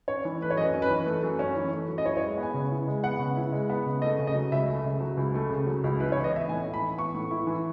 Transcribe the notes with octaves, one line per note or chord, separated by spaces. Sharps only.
C#4 C#5
E3
A3 B4
C#5
F#2 D#5
C#4
B4
E3
A3
F#2
C#4
E3
A3
F#2
D#5
E4 C#5
C#5
G#3
B3
G#5
C#3
E4
G#3
B3 F#5
C#3
E4
G#3
B3
C#3
A3 D#5
C#3
D#5
F#3
C#2 E5
A3
C#3
F#3
C#2
A3
C#3
F#3
C#2
E4 B4
C#5
E3
D#5
B3 E5
A2 G#5
E4
B5
E3
B3 C#6
A2
E4
E3